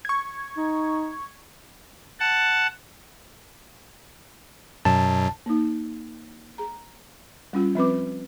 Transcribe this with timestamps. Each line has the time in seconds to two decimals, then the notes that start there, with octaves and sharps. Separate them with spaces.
0.05 C#6 G#6
0.57 D#4
2.20 F#5 A5
4.85 F#2 B2 F#3 A5
5.46 A#3 D#4
6.58 G#4 A#5
7.53 G3 C#4 F4
7.75 F3 C4 B4 D6